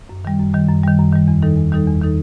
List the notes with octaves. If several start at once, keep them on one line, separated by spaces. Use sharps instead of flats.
F#2
D#3 G3
F#2
D#3 G3
F#2
D#3 G3
F#2
D#3 G3
E2
D#3 G3 D#4 A4
E2
D#3 G3 D#4 A4
E2
D#3 G3 D#4 A4